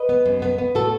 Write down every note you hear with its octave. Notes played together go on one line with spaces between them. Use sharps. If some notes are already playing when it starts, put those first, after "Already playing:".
Already playing: B4 D#5
B3
F#2
B3
B3
A2 F#4 A4